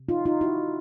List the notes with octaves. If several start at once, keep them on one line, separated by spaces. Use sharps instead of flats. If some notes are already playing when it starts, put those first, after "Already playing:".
Already playing: C3
D#4 F4
D#4 F4
E4 F#4